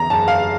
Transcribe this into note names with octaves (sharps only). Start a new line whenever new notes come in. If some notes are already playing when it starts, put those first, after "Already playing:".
Already playing: E2 A#5
F#1 A5
F5